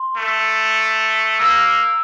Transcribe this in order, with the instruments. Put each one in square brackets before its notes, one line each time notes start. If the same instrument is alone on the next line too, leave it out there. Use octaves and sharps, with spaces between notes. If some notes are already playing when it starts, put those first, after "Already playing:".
Already playing: [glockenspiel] C6
[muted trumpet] A3
[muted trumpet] A#3 [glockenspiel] E6